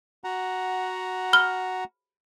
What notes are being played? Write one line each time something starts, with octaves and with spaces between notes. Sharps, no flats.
F#4 F#5 A#5
B5 F6 G7